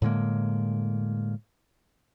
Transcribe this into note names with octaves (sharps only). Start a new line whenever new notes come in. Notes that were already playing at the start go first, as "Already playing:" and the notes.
A2 D3 G#3 A#3